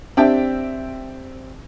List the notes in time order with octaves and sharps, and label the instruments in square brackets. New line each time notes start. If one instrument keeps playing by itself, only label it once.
[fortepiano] C4 D4 G4 E5 G5 A5